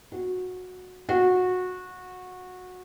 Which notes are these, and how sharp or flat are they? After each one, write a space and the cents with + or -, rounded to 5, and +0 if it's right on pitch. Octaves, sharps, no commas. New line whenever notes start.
F#4 -15
F#4 -20